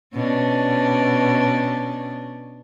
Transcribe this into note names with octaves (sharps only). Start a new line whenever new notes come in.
B2 C#4 D4